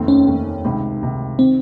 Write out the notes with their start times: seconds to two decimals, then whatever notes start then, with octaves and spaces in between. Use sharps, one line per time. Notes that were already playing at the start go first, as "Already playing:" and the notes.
Already playing: F1 D#2 D#3 A3 C4
0.08 C#4
0.27 F1 D#2 D#3 A3 C4
0.65 C#2 C3 D#3
1.01 C#2 C3 D#3
1.38 D#3 C4